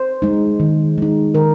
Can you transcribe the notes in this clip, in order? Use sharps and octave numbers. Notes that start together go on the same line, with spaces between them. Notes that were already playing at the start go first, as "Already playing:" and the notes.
Already playing: C5
G#3 D#4
D#3
G#3 D#4
D#3 A#4